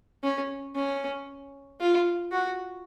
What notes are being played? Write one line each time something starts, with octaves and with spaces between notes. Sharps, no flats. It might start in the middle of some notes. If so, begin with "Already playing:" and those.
C#4
C#4
F4
F#4